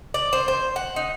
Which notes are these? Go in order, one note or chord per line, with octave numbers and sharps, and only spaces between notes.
D5
C5
C5
F#5
D#4